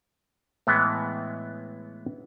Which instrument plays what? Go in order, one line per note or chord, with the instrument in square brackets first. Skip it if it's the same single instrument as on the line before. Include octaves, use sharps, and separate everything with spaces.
[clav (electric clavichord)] A2 E3 G#3 B3